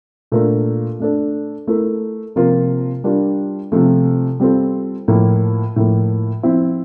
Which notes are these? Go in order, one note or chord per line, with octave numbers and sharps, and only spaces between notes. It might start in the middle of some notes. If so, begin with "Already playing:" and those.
A#2 A3 D4 F4 A#4
A3 D4 A4
A3 E4 A#4
C3 F3 A#3 F4 A#4
G3 D4 F4 A#4
C3 F3 A3
G3 C4 F4 A4
A2 F3 A#3
A2 F3 A#3
F3 C4 E4